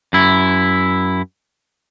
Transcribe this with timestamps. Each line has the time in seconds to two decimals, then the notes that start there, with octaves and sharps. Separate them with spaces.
0.13 F#2 E4